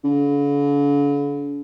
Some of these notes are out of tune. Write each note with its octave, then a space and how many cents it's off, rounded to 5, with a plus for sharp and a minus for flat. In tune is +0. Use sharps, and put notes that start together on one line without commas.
D3 -45